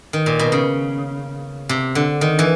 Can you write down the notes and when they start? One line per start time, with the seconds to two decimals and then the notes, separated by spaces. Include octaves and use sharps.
0.13 D#3
0.26 A#2
0.39 B2
0.52 C#3
1.69 C3
1.95 D3
2.21 D#3
2.39 E3